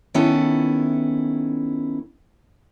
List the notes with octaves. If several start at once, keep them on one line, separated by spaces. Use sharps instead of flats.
D#3 B3 C#4 E4 A4